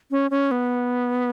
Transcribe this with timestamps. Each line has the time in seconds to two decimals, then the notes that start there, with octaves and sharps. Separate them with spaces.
0.11 C#4
0.31 C#4
0.51 B3